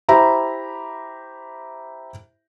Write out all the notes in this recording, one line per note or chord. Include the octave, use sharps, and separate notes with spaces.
E4 G4 C5 E5 A#5 B5